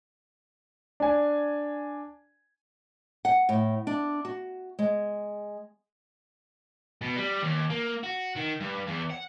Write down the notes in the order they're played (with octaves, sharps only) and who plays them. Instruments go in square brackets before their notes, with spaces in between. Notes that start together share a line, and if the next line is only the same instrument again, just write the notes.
[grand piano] D4 G#5
[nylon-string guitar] F#5
A2
D4
F#4
G#3
[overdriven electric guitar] B2
G3
D#2
A#3
F#4
D#3
G2
E2
F#5